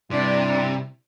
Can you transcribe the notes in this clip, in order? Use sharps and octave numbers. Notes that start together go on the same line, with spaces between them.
G2 C3 G3 D4 E4